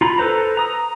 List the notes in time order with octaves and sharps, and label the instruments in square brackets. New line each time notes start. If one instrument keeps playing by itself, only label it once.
[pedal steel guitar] F4 A#5 B5
A4 B4 C5 A#5
A#5 D#6